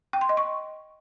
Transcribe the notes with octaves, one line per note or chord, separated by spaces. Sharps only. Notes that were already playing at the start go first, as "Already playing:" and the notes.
G5
C6
D#5
C#6